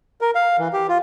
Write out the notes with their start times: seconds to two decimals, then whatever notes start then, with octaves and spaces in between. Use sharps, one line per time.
0.21 A#4
0.35 F5
0.59 E3
0.73 G4
0.89 F4